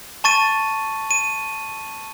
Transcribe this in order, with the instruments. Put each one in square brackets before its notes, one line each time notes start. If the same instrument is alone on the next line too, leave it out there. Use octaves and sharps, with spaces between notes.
[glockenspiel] A5 C#6 A6 D#7
D#7